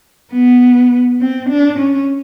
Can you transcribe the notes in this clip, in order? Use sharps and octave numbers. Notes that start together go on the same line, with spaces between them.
B3
C4
D4
C#4